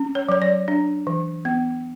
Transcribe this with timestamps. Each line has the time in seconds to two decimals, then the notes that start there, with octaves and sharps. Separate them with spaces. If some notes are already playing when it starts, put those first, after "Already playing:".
Already playing: C#4
0.15 C#5
0.29 F#3 C#5
0.42 D5
0.68 D4
1.07 E3
1.45 B3